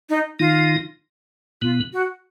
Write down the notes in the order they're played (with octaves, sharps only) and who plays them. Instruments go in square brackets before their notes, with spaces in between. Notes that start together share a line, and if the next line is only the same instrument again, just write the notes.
[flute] D#4
[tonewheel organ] D#3 D#4 [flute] F4
[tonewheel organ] B2 B3 [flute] F4
[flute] F#4